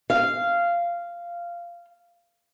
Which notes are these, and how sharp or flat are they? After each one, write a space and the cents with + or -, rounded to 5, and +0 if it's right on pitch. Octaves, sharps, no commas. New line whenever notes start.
F5 -15